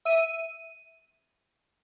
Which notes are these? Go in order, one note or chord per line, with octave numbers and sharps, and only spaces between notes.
E5 D#7